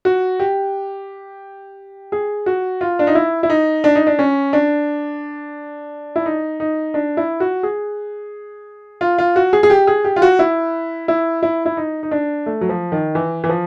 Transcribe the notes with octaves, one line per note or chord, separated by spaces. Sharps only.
F#4
G4
G#4
F#4
F4
D4
D#4
E4
E4
D#4
D4
D#4
D4
C#4
D4
E4
D#4
D#4
D4
E4
F#4
G#4
F4
F4
F#4
G#4
G#4
G4
G#4
G4
F4
F#4
E4
E4
E4
E4
D#4
D#4
D4
A3
F#3
F3
D#3
E3
E3
F3